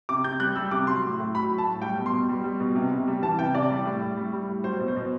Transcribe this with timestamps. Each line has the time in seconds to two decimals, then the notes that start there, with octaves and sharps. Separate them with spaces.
0.09 C3 D6
0.24 C3 G6
0.40 G3 F#6
0.56 G3 E6
0.71 C3 D6
0.87 F#3 C6
1.04 A2
1.19 A2
1.35 F#3 B5
1.51 F#3
1.58 A5
1.66 A2
1.82 G3 G5
1.97 B2
2.06 C6
2.13 B2
2.29 G3
2.44 G3
2.60 B2
2.75 C3
2.92 C3
3.07 G3
3.23 E3 A5
3.38 C3 G5
3.55 C3 D5
3.70 G3
3.85 A2
4.02 A2
4.17 G3
4.33 G3
4.48 A2
4.64 F#3 C5
4.80 B2
4.88 C5
4.96 B2